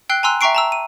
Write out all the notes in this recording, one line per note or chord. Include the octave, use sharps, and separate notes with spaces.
G5 E6 F#6 C7 G7
G#5 A#5 C6 E6 F#6
E5 G5 A#5 C#6 C7 D7
A5 A#5 E6
D#7